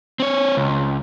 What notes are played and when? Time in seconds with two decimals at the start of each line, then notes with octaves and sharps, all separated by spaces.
0.20 C4 C#5
0.57 C#2